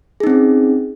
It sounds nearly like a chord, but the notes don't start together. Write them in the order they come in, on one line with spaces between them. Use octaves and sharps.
G#4 D#4 C4 C#4